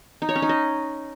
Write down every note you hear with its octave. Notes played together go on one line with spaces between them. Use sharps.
D#4
C#5
C#4
D#4
D#5